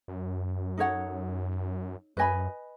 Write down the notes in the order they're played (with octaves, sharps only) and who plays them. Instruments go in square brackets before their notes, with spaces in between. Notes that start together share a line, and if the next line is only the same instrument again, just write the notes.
[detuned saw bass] F#2
[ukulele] D#4 A4 C#5 F#5
[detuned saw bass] F#2 [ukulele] B4 D#5 G#5 B5